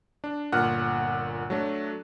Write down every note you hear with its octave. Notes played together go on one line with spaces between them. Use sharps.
D4
G1 A#2 F#5 F6 F#6
F#3 A3 D4